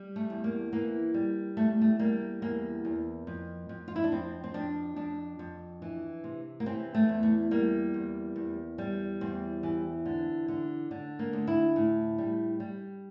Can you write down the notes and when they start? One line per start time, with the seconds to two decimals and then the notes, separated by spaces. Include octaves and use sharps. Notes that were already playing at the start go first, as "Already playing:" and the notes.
Already playing: G3
0.16 A3
0.30 E2
0.44 A#3
0.72 E3 A#3
1.14 G3
1.57 E2 A3
1.82 A3
1.99 G3 A#3
2.42 E2 A#3
2.85 E2
3.27 F2
3.69 F2
3.88 F4
3.96 E4
4.04 D4
4.12 F2 C4
4.44 C4
4.54 F2 D4
4.96 F2 D4
5.39 F2
5.82 E3
6.24 C3
6.60 A#3
6.66 E3 C4
6.95 A3
7.09 E2
7.23 A3
7.51 G3 A#3
7.94 E2
8.36 E2
8.78 G3
9.21 E2 C4
9.63 E3
10.06 D3
10.48 D3
10.91 D3
11.19 A#3
11.33 D2
11.47 E4
11.76 A2
12.18 G3
12.60 G3